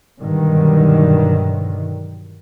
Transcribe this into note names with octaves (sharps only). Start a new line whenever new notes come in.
G2 B2 D3 D#3 F#3